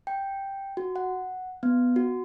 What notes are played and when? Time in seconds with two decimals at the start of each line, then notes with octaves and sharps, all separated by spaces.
0.07 G5
0.77 F#4
0.96 F#5
1.63 B3
1.96 F#4